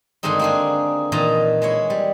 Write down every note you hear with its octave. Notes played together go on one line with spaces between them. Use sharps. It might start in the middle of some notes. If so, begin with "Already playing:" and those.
G2 D3 D#3 G#3 C4 D#4
A#3 D4 G#4
A#2 D#3 E3 D#5 A5 A#5
G#3 E4 C#5
G3